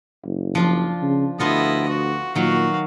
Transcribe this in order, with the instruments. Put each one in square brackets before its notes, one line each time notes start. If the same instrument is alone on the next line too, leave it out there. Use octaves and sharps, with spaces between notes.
[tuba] F#1
[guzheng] F3 D4 F4
[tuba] C#3
[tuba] D2 [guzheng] B3 F4 A4 [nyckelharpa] E4 D#5
[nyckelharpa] F#4
[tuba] A#2 [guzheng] D#3 F#3 [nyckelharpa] F#4 F5